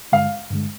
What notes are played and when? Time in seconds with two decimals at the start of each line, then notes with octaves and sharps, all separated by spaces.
0.12 G2 D3 G#3 F5
0.50 G2 D3 G#3